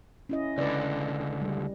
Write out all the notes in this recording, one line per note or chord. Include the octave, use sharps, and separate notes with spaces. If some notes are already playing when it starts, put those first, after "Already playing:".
C#4 E4 D#5
C#2 D3 B4 D5
G3